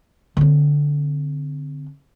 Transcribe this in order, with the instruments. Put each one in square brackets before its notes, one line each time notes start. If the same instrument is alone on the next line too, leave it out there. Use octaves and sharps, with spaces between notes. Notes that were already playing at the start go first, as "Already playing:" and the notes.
[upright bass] D3 C4